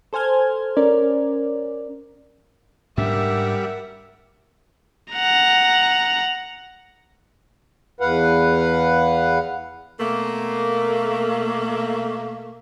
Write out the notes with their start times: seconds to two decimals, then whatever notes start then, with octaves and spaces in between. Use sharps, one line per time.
0.13 A4 C5 G#5 F6 G#6
0.77 C#4 A#4 D5
2.97 G#2 G3 C#4 D4 A#4 E5 F#5
5.13 F#5 A#5
8.00 E2 B4 F5 F#5
9.99 B2 A3 A#3